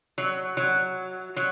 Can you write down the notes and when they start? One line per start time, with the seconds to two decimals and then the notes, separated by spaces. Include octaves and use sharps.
0.18 F#3
0.57 F#3
1.36 F#3